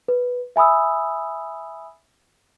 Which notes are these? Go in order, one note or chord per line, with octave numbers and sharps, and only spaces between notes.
B4
E5 G#5 B5 D#6 E6